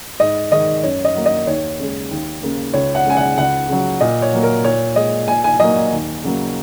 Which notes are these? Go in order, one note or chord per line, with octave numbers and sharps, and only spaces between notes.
G#2 D#5
D#3 G#3 D#5
F#2 C#5
D#5
F#3 A#3
D#5
D#2 C#5
C#3 G#3
D#2
C#3 A#3
C#2 C#5
F#5
C#3 G#3 G#5
F#5
C#2 F#5
C#3 F#3
A#2 D#5
C#5
F#3 A#3
A#4
A#2 C#5
G#3 D#5
A#2 G#5
G#5
F#3 A#3 D#5
D#2
C#3 F#3 A#3